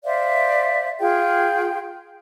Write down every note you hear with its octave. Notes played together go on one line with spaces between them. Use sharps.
C5 D5 E5 F5
F4 G#4 G5